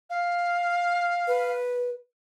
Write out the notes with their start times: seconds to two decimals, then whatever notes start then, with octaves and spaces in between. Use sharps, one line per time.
0.10 F5
1.27 B4